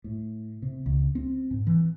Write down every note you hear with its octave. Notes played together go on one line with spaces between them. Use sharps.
A2
C3
C#2
C4
G#2
E3